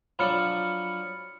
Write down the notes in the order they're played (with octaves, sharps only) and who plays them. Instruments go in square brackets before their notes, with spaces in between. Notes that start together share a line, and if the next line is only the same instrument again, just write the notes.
[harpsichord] F3 F#3 D4 [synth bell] B5 F6 C#7